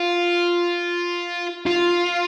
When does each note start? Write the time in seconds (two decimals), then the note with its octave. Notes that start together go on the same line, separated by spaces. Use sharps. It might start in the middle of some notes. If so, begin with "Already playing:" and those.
Already playing: F4
1.66 F4